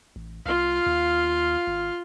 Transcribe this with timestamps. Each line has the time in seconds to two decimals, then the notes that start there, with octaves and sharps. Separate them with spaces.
0.16 A1
0.46 C2 F4 F5
0.86 D#2
1.67 G#1